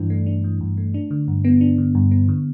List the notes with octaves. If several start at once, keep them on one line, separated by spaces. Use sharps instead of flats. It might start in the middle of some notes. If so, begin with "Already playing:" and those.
Already playing: G2 E3 D4
A3
D4
E3
G2
A3
D4
D3
G2
B3
D4
D3
G2
B3
D3